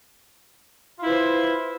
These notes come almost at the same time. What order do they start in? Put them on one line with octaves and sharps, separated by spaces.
F4 E4 B4 C5